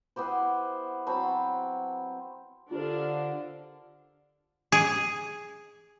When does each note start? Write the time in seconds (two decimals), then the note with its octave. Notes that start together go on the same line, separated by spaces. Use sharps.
0.16 B3 E4 G4 C5
1.07 F#3 C4 A5 B5
2.71 D3 D4 F4 G4 A#4 C5 F5
4.72 G#4